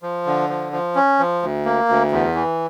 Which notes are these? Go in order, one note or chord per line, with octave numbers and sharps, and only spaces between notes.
F3
D3
F3
F3
C#4
F3
D2
A#3
D2
E2
E3